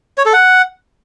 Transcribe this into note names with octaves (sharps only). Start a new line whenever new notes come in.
C#5
A4
F#5